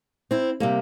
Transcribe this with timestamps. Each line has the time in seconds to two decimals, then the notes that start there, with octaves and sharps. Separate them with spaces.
0.31 C4 E4
0.60 C3 G3 A#3